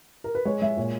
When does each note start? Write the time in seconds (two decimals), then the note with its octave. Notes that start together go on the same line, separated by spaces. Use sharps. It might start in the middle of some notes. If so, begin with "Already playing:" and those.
0.24 A#4
0.35 B4
0.45 G#3 C#5
0.62 G#3 E5
0.77 A#2 C#5